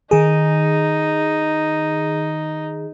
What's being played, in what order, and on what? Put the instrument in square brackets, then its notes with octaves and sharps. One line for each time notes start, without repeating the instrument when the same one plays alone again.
[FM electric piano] D#3 G#4 [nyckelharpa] D#4